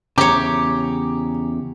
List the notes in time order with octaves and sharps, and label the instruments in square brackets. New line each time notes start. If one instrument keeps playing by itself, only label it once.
[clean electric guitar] E2 C#3 [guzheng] G4 C#5 [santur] A#5 [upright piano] D6